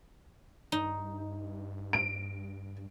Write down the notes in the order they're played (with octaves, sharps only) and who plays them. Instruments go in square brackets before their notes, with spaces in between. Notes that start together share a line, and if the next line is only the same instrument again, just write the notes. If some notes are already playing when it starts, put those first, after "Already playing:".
[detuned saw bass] G2 [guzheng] D#4
[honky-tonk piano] D7